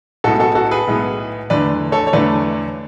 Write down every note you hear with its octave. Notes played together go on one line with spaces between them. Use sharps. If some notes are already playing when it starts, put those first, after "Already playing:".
B1 A2 G#3 B3 F#4 A4
F#4 A4
F#4 A4
G#4 B4
B1 A2 G#3 B3
E2 D3 A3 B4 D5
A4 C#5
C#5
E2 D3 A3 B4 D5